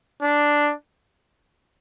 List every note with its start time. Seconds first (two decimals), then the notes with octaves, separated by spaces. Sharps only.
0.22 D4